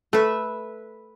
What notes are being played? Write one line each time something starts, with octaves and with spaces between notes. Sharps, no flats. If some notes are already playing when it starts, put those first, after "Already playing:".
A3 B4 E5